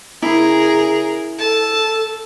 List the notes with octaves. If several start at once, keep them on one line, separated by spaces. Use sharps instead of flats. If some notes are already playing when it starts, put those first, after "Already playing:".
C#3 E4 G#4 A#4
A4 A5